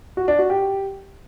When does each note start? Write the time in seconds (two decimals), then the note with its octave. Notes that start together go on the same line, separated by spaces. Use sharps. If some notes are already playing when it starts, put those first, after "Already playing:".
0.17 F#4
0.28 D4
0.39 F#4
0.50 G4